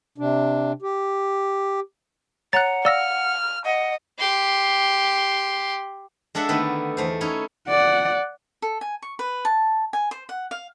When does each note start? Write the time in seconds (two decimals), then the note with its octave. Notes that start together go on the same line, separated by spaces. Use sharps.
0.18 C3 D4
0.82 G4
2.53 C#5 F#5 A#5 F#6 A6 F7
2.85 D5 F5 E6 F6 A#6
3.65 D#5 F#5
4.19 G4 C6
6.35 G#3 D4 A4 E5 F#5
6.49 D3 D#3 A3 B3
6.97 E2 A3 C5
7.21 C#4 D#4 E4 C#5
7.69 D5 F#5
8.62 A4
8.81 G#5
9.02 C#6
9.19 B4
9.45 A5
9.93 G#5
10.11 C5
10.29 F#5
10.51 F5